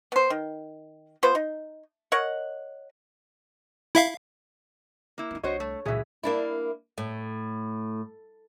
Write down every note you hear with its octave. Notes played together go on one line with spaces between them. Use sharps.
B3 C5
D#3
B3 F4 B4 C5
D#4
A#4 C#5 D#5 F#5
E4 E5 F5
A#3 E4
C#4 D#4
C2 D4 F#4 C5 C#5 D#5
A3
C#2 A#2 C#3 E3 F#3 G#4 E5
A#3 D4 E4
A2